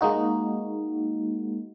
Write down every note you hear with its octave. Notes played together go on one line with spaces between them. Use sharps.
G#3 A#3 D#4 F#4